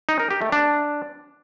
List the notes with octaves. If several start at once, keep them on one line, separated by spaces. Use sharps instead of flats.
D#4
A#4
G4
A3
D4